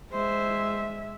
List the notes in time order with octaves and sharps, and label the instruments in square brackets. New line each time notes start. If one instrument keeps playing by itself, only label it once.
[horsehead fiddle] G#3 E5 [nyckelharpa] C5